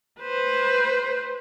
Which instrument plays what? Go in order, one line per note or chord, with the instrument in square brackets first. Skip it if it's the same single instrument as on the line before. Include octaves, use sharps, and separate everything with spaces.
[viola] B4 C5